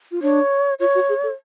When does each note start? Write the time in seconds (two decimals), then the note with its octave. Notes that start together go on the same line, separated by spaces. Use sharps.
0.12 F4
0.22 D4 C#5
0.80 F4 C#5
0.95 F#4
1.09 G#4
1.23 A4